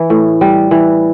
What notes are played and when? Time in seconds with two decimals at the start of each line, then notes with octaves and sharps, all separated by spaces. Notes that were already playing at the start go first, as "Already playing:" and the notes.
Already playing: E3
0.10 A2
0.41 G3
0.71 E3